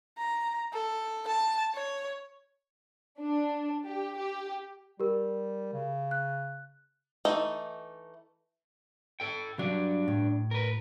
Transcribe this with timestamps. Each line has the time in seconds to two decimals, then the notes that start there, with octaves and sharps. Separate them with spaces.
0.18 A#5
0.73 A4
1.27 A5
1.74 C#5
3.20 D4
3.85 G4
4.16 G4
5.00 G3 G4 A#4
5.73 C#3
6.11 F#6
7.25 E3 A3 D#4
9.20 A4 G5
9.59 G2 F#3 D4
10.08 A2
10.51 A#4 B4